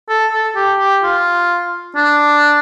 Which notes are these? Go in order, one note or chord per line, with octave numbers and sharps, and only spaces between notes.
A4
A4
G4
G4
F4
D4